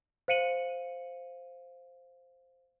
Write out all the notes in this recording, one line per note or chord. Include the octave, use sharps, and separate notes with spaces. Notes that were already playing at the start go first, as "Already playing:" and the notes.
C5 F5 C#7 D#7 F#7